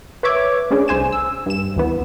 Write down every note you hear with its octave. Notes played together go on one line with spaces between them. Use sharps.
B4 C#5 E5 D6 G#6
A3 C#4 D4 G#4 C#5
C2 C5 G#5 E7
E6
G2 E7
D2 E3 B3